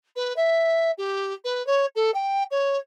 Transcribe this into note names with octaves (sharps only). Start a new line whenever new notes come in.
B4
E5
G4
B4
C#5
A4
G5
C#5